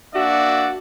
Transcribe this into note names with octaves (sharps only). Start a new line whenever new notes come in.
A#3 D4 F#4 D5 E5